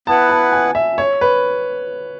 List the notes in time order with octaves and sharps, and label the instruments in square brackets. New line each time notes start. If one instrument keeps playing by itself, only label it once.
[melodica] B3 E4 B4 F#5 [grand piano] A5
[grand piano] A5
G#5
E5
C#5
B4